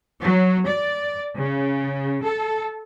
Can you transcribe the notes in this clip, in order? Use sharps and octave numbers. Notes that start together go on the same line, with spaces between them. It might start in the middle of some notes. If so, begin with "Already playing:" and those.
F#3
D5
C#3
A4